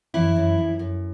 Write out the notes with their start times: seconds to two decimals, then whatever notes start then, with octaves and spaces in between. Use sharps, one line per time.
0.14 F#2 E3 E4
0.36 F#2
0.58 F#2
0.79 F#2